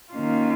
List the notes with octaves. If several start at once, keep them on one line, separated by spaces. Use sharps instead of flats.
D#3 A#3 C#4 F4